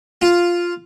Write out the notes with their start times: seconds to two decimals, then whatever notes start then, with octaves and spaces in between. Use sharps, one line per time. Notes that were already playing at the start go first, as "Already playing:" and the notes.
0.22 F4